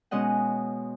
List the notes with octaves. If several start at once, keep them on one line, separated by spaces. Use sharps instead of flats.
B2 G#3 C#4 D#5 F#5